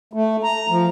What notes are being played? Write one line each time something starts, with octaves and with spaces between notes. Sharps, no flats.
A3
A#5
F3